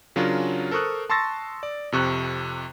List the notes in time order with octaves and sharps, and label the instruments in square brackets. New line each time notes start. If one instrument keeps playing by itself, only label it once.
[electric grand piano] C#3 F#3 C#4 D4 F4 A#4
A4 A#4 C5 C#6 D#6 F#6
A5 C6 C#6 E6 A6 A#6
D5
F2 C3 C#6 F#6